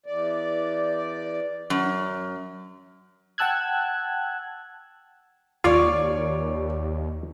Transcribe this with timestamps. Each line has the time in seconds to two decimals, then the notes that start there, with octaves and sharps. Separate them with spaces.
0.06 E2 D5
1.70 F#2
3.38 F#5 G5 A5 E6 F#6 G#6
5.64 D#2 F4 C#5 D5 C#6 D6